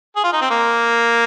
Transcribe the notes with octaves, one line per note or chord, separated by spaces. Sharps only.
G#4
F4
D#4
C4
A#3